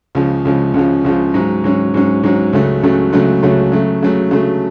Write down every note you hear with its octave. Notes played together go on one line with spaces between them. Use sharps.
C#2 C#3 F3
C#2 C#3 F3
C#2 C#3 F3
C#2 C#3 F3
G#2 F#3 C#4
G#2 F#3 C#4
G#2 F#3 C#4
G#2 F#3 C#4
C#2 C#3 F#3 A3
C#2 C#3 F#3 A3
C#2 C#3 F#3 A3
C#2 C#3 F#3 A3
C#3 F#3 A3
C#3 F#3 A3
C#3 F#3 A3